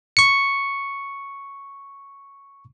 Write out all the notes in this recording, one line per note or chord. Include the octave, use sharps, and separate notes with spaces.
C#6 C#7